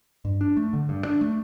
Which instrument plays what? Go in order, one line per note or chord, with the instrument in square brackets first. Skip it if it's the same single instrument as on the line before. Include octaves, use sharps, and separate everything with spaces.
[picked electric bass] G2
D4
A3
D3
G2
D4
A3